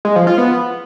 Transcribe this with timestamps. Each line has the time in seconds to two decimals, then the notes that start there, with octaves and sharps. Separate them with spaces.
0.05 G#3
0.16 F3
0.27 F4
0.38 B3